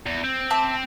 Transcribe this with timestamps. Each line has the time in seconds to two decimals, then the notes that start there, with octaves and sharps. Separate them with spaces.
0.06 E2
0.24 C4
0.50 E5 A5 D6